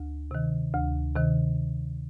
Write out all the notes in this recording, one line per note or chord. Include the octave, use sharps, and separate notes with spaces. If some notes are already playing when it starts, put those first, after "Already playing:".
Already playing: D2
C3 D#3
D2
C3 D#3